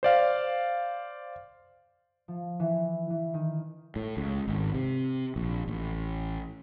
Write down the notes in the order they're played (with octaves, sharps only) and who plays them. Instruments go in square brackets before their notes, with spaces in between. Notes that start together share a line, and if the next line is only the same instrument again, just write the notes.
[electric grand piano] C5 D5 F5
[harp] F3
E3
E3
D#3
[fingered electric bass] A2
C#2
G#1
C3
A#1
A1